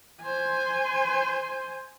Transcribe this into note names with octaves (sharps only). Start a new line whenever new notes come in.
C5 G#5